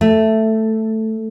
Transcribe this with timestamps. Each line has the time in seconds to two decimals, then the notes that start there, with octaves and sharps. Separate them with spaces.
0.01 A3